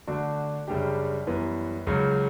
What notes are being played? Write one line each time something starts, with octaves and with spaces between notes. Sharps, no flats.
D3 A3 D4 F#4
F#2 C#3 G3 D4 G4
F#2 E3 G3 B3
C#2 C#3 F#3